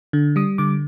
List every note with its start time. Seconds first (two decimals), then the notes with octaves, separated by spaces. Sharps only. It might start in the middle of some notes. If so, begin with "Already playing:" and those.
0.13 D3
0.36 G3 D#6
0.58 D3 D6